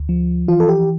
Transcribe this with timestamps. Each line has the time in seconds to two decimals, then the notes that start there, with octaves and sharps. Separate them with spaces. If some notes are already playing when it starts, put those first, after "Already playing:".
Already playing: D2
0.09 F3
0.48 E3 F4
0.60 A4
0.69 G4